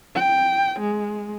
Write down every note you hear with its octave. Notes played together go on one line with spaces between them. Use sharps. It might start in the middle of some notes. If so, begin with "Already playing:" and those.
G5
G#3